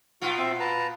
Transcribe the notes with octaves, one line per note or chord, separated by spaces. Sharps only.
A#2 B3 F4 F#4
C4 E5
B4 A5 A#5